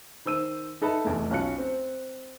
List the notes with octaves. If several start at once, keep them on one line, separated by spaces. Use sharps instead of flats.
D#3 C5 E6 D#7
D#4 A4 B4 E5 A5 B5
F1 E2 A3
B1 C#4 F4 F#6 C#7
C4